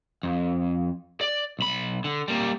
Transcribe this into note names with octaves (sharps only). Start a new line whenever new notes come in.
F2
D5
B1 B5
D3
G3 A#3